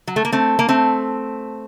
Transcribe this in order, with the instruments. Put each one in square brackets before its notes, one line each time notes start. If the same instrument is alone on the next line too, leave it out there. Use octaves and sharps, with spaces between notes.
[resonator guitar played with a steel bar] F#3
A3
A#3
A3 C4
A#3
A3 C4